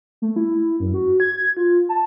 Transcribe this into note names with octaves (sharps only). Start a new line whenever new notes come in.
A3
E4
F#2
F#4
G#6
F4
A5